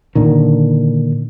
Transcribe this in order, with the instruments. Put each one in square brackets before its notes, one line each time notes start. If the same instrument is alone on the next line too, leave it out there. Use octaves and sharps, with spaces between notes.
[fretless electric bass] A#2 D3 D#3